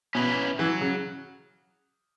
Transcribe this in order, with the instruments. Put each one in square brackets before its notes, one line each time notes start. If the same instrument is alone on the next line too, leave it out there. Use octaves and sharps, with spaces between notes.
[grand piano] B2 [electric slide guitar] C#4 E4 B4
[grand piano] E3 [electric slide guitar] F#3
[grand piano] C#3